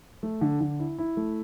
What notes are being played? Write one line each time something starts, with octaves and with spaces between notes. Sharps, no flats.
A3
D3
D3
E4
E4
A3